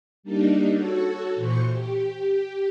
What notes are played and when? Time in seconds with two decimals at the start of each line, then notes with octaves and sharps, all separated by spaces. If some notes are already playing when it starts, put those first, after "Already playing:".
0.23 G3 A#3 D4 D#4
0.73 F#4 A4 C#5
1.35 A#2 E3 C5 C#6
1.72 G4